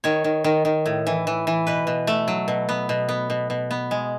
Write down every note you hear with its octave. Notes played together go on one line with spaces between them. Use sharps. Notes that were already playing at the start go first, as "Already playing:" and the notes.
D#3 C#5
D#3
D#3
D#3
A2
E3
E3
E3
B2 B4
B2
A3
F#3
B2
B3
B2
B3
B2
B2
B3
G#3